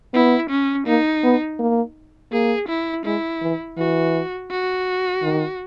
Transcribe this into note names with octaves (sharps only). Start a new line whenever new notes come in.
B3 E4
C#4
A#3 D#4
B3
A#3
A#3 G#4
E4
G#3 E4
E3
E3 F#4
F#4
D#3